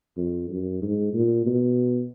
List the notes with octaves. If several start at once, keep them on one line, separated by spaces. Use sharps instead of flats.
F2
F#2
G#2
A#2
B2